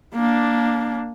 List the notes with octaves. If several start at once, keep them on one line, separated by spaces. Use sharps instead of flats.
A#3 D4